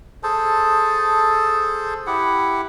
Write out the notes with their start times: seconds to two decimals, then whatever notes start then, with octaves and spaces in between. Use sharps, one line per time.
0.23 G#4 A4 C5 A5
2.07 E4 G4 F#5